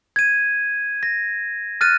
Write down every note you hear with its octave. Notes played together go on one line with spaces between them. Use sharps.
G#6 D#7
A#6
F6 F#6 A6 D#7